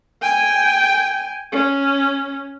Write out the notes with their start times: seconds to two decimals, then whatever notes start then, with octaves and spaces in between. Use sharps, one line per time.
0.23 G5 G#5
1.52 C#4